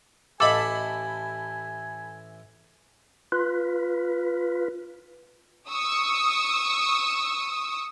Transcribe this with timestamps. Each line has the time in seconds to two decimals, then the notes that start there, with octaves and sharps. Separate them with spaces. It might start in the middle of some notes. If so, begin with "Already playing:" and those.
0.40 A1 E4 A4 D#5 F5 G#5 B5 D6
3.32 F4 B4
5.70 C#6 D#6 E6